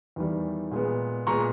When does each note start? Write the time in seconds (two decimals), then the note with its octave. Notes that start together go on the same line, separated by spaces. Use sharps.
0.16 E2 D#3 G3
0.71 A#2 G#3 B3
1.27 A#2 G#3 B3 A#5 C#6